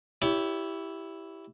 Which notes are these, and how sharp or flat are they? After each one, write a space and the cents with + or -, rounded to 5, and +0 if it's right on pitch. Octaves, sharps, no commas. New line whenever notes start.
E4 +0 G4 +0 C#5 +40